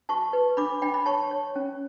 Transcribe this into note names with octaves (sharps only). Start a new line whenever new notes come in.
F#4 A5 C#6
B4
D4 B5 D6
D4 G5 B5
B5
C#5 A5 C#6
C#5
C#4